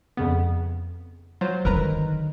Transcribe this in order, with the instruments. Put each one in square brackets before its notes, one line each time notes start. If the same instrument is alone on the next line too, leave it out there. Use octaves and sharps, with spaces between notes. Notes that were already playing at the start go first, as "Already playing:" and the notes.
[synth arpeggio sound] F2 C#3 B3
F#3 F4 C5
[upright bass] D3 D#3 [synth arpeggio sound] A#4 B4 A#5